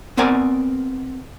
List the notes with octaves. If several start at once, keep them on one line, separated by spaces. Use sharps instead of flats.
B3 C4 A#4 D5 G#5